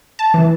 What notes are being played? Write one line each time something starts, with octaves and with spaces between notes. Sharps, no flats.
A5
E3